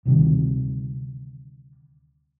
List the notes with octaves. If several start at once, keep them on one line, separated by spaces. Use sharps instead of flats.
D2 C3 D#3 G3